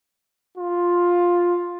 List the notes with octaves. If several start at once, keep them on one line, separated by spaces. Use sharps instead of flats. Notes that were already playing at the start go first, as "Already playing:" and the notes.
F4